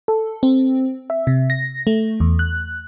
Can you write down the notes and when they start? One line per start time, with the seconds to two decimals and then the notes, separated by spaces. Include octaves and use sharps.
0.08 A4
0.43 C4
1.10 E5
1.27 C3
1.50 A#6
1.87 A3
2.20 E2
2.39 F#6